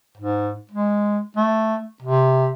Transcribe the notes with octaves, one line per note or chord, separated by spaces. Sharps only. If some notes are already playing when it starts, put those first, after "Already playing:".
G#2
G#3
A3
C3